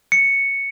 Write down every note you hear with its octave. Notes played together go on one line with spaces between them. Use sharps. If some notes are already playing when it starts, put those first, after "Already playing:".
C#7